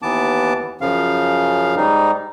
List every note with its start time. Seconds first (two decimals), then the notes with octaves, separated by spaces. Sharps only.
0.02 D#2 E3 B3 A5 D6
0.81 F#2 C#3 F3 F5
1.77 G#2 G3 D#4